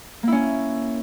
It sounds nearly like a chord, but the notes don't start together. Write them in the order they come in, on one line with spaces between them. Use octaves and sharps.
A#3 E4 C#4